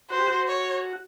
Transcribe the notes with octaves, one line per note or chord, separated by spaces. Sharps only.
F#4 C5
G4
F#4
C#5